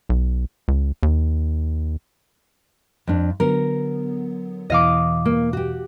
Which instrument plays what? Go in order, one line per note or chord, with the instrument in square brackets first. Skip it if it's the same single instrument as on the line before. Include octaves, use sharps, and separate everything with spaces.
[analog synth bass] B1
C#2
D#2
[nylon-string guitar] F2 D4
[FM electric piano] D3 F#3 B3 [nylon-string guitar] A#4
[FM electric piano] E2 B2 E3 [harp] D#5 F5 D6
[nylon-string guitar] A#3
F#4 G4